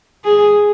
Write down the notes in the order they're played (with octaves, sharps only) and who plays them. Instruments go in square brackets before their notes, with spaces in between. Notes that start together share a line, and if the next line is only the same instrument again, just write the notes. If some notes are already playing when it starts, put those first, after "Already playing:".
[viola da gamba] G#4